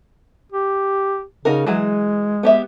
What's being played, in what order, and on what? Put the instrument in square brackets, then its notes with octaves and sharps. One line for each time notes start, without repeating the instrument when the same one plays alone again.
[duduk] G4
[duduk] C#3 [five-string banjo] D#4 F#4 A#4
[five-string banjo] E3 F#3 G#4 [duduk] G#3
[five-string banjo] B3 G4 E5